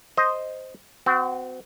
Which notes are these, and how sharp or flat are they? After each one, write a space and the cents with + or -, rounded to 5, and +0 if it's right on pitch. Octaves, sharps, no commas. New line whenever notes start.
C5 +0 D#5 +0
C4 -35 F#4 +0